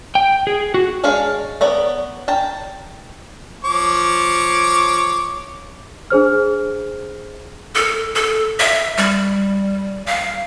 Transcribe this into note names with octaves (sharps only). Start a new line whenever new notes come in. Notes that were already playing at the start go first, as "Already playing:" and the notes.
G5
G#4
F#4
G#3 D4 G#4 C#5 F5
B3 C#5 D5 A#5
G5 A5 A#5
F3 C#5 D6
D4 G#4 C5 F6
A4
A4
E5
G3
F5